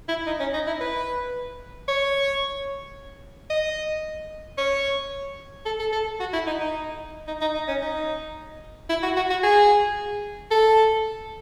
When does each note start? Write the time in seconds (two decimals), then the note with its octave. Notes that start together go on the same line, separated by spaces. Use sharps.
0.09 E4
0.26 D#4
0.40 C#4
0.54 D#4
0.67 E4
0.81 B4
1.88 C#5
3.50 D#5
4.58 C#5
5.66 A4
5.79 A4
5.93 A4
6.20 F#4
6.33 E4
6.47 D#4
6.60 D#4
7.28 D#4
7.41 D#4
7.55 D#4
7.68 C#4
7.82 D#4
8.89 E4
9.03 F#4
9.16 F#4
9.30 F#4
9.43 G#4
10.51 A4